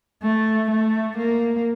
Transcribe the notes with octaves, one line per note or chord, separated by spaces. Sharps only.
A3
A3
A#3